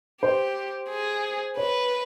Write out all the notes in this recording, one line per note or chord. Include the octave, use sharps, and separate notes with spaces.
G4 C5
G#4
B4 C#5